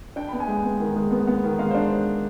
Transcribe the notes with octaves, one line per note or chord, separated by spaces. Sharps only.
D4 G5
B5
B3
G#5
G#3 G5
B3
D#3
G#3
B3
B3
D#3
G#3 F5
C5
D4